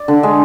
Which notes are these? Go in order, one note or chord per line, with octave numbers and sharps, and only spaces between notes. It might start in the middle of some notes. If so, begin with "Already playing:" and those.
Already playing: D5
D3
G#3